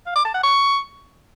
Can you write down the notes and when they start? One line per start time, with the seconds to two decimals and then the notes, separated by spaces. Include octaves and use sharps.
0.06 F5
0.16 D6
0.25 A5
0.34 F#5
0.43 C#6